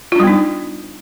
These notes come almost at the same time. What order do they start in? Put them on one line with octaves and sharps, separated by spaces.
F4 D4 G3 B3 D#4